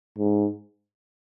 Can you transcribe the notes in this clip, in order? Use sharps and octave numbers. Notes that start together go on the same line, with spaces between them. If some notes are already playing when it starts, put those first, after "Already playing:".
G#2